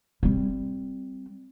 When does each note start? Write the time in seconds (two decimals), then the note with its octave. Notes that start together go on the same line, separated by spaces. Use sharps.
0.23 G3 C4